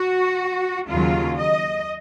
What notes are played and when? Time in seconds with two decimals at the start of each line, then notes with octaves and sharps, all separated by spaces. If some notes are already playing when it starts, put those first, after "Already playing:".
Already playing: F#4
0.88 D#2 C#3 F#3 F4
1.38 D#5